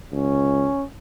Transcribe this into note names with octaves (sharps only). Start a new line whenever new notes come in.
C#2 C#4